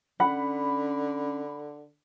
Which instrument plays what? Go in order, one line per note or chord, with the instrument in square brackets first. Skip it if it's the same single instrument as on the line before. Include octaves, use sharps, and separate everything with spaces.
[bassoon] D3 [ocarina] C#4 [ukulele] F#5 [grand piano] B5